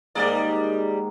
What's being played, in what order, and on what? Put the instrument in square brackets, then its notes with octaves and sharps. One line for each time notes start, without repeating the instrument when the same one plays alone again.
[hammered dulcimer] G#2 D#3 A#3 [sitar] G3 G#4 D5